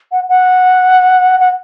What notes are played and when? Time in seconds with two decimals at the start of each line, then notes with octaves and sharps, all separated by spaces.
0.12 F#5
0.29 F#5
1.40 F#5